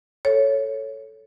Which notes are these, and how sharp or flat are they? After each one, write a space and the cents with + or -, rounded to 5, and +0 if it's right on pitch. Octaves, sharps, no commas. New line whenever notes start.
A4 +0 C#5 +0